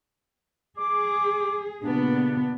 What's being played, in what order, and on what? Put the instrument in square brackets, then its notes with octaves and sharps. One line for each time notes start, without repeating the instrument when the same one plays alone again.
[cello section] G#4 [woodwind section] D6
[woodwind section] G2 C#3 D4 [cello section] A#2 B3